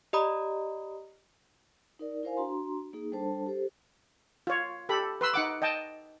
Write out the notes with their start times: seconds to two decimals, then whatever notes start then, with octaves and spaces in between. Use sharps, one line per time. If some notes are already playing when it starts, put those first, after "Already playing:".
0.13 G4 D5 D#5 A#5 B5 D#6
1.99 D#4 A#4 D5
2.23 E4 A#4 C5 F5 G#5
2.37 D4 F#4 A#5 C6
2.93 A#3 D#4 G#4
3.12 G3 D4 A4 C5 A5
3.46 G4 A4 C5
4.47 F4 C#5
4.89 G4 A4 B5
5.21 B4 C6 E6
5.34 D#4 F#5 D6
5.62 D#5 G5 A5